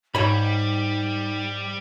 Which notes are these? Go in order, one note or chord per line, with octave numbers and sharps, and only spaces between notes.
G#2 G3 D#4 C#5 B5